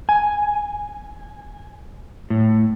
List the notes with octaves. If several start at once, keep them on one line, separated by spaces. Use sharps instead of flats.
G#5
A2